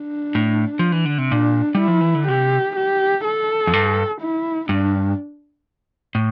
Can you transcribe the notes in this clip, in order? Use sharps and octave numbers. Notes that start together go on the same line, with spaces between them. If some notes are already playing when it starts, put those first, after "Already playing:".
Already playing: D4
A2
F3
E3
D3
C3
A#2 D4
G3
E4
F3
E3
D3
C3 G4
G4
A4
F2
G2
E4
G2 D4
A2